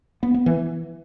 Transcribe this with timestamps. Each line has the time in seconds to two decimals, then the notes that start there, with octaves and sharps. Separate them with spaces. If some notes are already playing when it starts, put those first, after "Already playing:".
0.23 B3
0.34 B3
0.46 E3